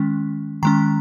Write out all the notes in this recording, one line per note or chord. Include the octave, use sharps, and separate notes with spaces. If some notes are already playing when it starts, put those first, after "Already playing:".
Already playing: D#3 G#3 C#4
D#3 G#3 C#4 A#5